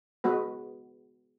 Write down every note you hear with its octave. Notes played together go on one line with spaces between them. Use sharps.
G#3 B3 F#4 B4